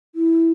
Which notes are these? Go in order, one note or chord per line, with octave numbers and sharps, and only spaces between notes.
E4